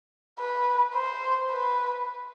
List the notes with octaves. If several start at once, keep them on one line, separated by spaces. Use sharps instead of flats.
B4
C5
B4